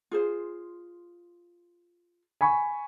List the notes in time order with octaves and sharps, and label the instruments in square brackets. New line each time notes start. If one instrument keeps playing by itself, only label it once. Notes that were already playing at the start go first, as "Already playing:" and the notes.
[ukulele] F4 G#4 C5
[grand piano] G#5 B5 C#6